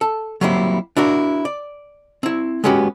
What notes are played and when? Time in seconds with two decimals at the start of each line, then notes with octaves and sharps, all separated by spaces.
0.01 A4
0.41 F#3 G3 A#3 C4 E4
0.97 D4 E4 F#4 A#4
1.45 D5
2.23 C4 E4
2.64 G#3 B3 C#4 F#4 G4